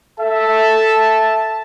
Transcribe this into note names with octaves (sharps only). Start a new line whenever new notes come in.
A4 E5 A5